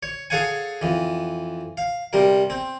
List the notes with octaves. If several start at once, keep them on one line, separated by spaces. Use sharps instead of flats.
C#5
G#4 A4 C#5 F5 F#5 G#5
F2 E3
F5
C3 G3 A#4
C4